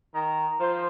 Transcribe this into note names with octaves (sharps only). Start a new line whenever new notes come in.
D#3 A#5
F3 C5